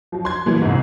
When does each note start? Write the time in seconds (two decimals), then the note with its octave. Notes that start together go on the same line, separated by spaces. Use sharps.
0.12 F3 F#3
0.25 C6 G#6
0.46 A#2 E3 F#3 G3 B3
0.62 C2 G#2